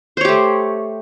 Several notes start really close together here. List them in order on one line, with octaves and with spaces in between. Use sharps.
C5 C#5 G4 A3